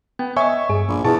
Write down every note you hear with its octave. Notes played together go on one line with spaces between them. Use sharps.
B3 G5
C#5 D#5 E5 G#5 C#6
G2 G#4
A#1
E2 B2 G#4 A5 C#6